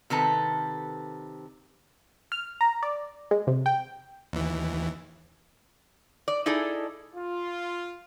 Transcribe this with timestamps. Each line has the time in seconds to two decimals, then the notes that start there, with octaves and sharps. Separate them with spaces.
0.10 C3 D#3 A4 B4
2.32 F6
2.61 A#5
2.83 D5
3.31 G#3
3.47 C3
3.66 G5
4.33 D#2 E3
6.28 D5
6.46 D#4 E4 G#4 A4 D5
7.15 F4